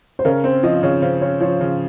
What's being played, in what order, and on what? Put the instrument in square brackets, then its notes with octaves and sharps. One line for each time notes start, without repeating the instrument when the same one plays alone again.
[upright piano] C5
[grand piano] C#3 [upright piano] A#4
[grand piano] C4 [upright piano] C5
[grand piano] F3 [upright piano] D#5
[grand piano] C#3 [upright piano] C#5
[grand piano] C#3 [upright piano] C5
[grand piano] C#3 [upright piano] C#5
[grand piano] F3 [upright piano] C#5
[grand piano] C#3